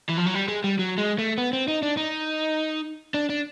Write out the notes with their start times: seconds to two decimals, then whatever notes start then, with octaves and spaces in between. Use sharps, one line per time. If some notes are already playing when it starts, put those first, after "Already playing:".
0.10 E3
0.18 F3
0.26 F#3
0.34 G3
0.49 G#3
0.64 G3
0.79 F#3
0.98 G#3
1.19 A3
1.38 B3
1.53 C4
1.68 D#4
1.83 D4
1.97 D#4
3.14 D4
3.29 D4